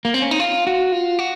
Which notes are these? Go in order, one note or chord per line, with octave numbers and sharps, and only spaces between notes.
A#3
C4
C#4
D#4
F4
F#4
F4
F#4